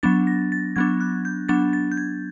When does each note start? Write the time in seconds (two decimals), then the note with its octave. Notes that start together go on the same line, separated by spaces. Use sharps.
0.03 F#3 B3 D4 A6
0.27 A#6
0.52 A6
0.76 F#3 B3 D4 G#6
1.00 F#6
1.25 G6
1.49 F#3 B3 D4 A6
1.73 A6
1.92 G6
1.97 G#6